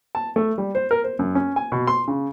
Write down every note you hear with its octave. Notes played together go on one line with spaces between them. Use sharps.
A5
A3
G3
C5
A#4
C5
F#2
C#4
G#5
B2
C6
C#3